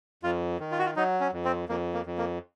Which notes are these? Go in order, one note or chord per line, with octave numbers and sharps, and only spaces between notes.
F2 F4
D#3
F4
F#4
F4
F#3 D#4
C#4
F2
C4
F2 A#3
A#3
F2
A#3